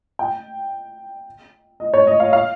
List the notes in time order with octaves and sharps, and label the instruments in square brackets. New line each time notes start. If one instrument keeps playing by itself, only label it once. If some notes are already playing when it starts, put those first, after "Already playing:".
[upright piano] G5
D#5
C#5
D#5
F5
F5